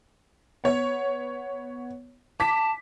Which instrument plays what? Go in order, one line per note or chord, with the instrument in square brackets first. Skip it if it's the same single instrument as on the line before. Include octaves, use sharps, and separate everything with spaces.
[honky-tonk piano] B3 C#5
[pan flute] A5 [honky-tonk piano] D6 B6